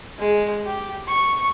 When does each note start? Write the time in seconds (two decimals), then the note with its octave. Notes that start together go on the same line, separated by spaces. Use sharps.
0.18 G#3
0.65 G4
1.08 C#6